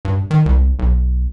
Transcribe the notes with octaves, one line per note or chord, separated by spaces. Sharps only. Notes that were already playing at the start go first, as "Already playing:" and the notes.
G2
D#3
C2
B1